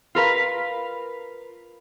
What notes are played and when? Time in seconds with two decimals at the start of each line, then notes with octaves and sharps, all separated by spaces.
0.15 F4 A#4 B4 F5